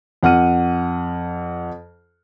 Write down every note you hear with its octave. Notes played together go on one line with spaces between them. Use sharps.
F2 F#5 F6 D#7